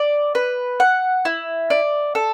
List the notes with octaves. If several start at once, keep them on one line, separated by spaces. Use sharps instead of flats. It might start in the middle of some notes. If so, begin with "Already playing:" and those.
Already playing: D5
B4
F#5
E4
D5
A4